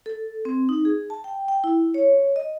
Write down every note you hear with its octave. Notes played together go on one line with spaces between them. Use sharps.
A4
C4
D#4
G#4
A5
G5
G5
E4
C#5
D#5